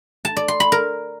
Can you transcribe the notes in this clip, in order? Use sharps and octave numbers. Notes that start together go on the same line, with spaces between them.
A5
D5
C6
B5
A#4